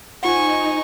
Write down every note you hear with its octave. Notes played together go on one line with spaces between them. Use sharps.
D#4 F4 C5 F#5 G#5 C#6